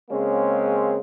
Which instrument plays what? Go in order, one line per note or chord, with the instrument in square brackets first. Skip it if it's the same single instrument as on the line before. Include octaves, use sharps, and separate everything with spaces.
[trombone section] C#3 G#3 A#3 C4 C#4